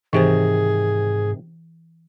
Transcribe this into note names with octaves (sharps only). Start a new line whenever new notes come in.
G#2 C3 D#3 E3 G4 G#4 C5